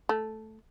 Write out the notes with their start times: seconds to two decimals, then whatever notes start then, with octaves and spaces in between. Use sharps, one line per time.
0.09 A3